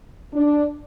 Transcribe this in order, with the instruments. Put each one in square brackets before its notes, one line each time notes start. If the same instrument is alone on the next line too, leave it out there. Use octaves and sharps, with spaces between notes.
[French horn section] D4